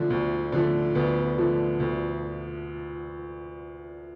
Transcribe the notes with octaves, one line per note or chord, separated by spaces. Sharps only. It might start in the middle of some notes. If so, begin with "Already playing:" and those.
Already playing: D3 F3 A3
D2
D3 F3 A3
D2 B3
D3 F3 A3
D2